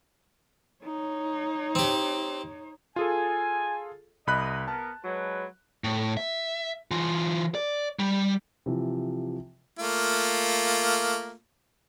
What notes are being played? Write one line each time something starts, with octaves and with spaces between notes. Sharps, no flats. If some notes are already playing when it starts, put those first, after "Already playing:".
D#4 C#5
C4 G4
F4 G#4 A4 G#5
C2 D#5 B5 F#6
B3 A#4 A5
F#3 G#3 B4
A2
E5
E3 F4
D5
G3
C3 E3 F3
A3 A#3 F4